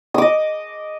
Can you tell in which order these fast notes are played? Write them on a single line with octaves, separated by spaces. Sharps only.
D#6 D6 D#5